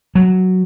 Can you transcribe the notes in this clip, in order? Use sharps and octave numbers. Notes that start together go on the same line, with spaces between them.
F#3